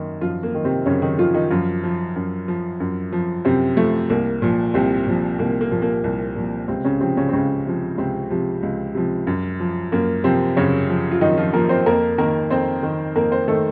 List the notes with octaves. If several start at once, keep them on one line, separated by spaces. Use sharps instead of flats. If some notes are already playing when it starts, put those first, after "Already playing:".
Already playing: F#2 D#3 A#3
F#2 F3 F4
A#3
D#3
C3 C4
F#2 C#3 C#4
D#3 D#4
D#3 F3 F4
D#3 D#4
F#2 F3 F4
F3
F#2
F3
F#2
F3
F#2 C3 C4
F3 A3
C2 A#3
A#2 F3
C2 C3 C4
A#2 F3
C2 A#3
A#3
A#2 F3
A#3
C2
A#2 F3
C#2 C3 C4
C#3 C#4
C3 F3 C4
C#3 C#4
C4
C#2 C#3 C#4
C3 F3
C#2 C3 C4
C3 F3
C#2
C3 F3
F#2
F3
F#2 A#3
C3 F3 C4
F#2 C#3 C#4
F3
F4
F#2 D#3 D#4
F3 F4
F3 A#3 A#4
C4 C5
F2 A#3 A#4
D#3 A#3 A#4
F2 C4 C5
D#3
F2 A#3 A#4
C4 C5
D#3 A3 A4